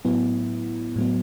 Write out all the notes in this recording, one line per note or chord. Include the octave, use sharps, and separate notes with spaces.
A2 F#3 B3 E4
A2 F#3 B3